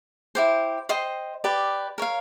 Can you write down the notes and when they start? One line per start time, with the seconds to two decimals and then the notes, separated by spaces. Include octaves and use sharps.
0.35 E4 G4 C5
0.89 C5 D#5 G5 C6
1.44 G4 B4 D5
1.98 A#4 C#5 F5